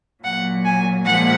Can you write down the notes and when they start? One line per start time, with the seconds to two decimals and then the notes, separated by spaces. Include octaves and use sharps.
0.23 A#2 F#3 F#5
0.64 G#5
1.06 A#2 F3 G#3 F#5